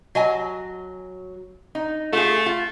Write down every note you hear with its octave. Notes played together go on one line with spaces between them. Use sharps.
F#3 D#5 G#5
D#4
A3 F4 G#4
F4